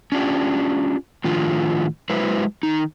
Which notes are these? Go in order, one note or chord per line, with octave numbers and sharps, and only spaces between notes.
C#4 D4 F4 G4 G5
A2 D#3 F3 D4 F4
F#3 G#3 E4 B4 C5
D#3 D#4